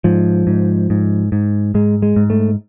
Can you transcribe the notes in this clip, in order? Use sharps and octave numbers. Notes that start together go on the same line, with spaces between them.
G#2 F3
G#2
G#2
G#2
G#2 G#3
G#3
G#2
A3